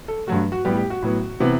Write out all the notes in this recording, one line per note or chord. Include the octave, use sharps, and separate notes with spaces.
A4
G2 F#3 A3 F#4
F#4
A2 G3 B3 G4
G4
F#4
A2 F#3 B3
C3 E3 B3